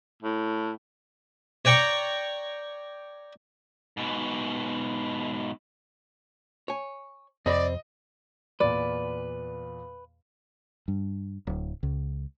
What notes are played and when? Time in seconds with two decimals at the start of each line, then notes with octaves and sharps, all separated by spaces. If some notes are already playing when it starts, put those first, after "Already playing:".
0.23 A2
1.65 C#5 D5 G5 A#5 C#6
3.97 G#2 B2
6.68 C#5 G#5
7.46 F2 C3 C4 D5 D#5 B5
8.60 E2 A#2 B4 D5
10.88 G2
11.47 D1
11.83 C#2